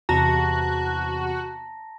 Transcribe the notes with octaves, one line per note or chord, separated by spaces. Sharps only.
E2 C3 F#4 A5 A#5 A#6